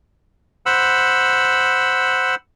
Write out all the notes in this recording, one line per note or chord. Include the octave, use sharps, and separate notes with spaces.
C5 F#5 B5 E6